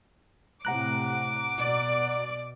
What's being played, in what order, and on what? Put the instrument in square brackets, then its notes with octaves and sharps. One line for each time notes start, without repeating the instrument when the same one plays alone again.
[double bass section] A2 C3 [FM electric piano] F#5 A#5 F#6 [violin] D6 D7
[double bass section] B2 [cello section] D5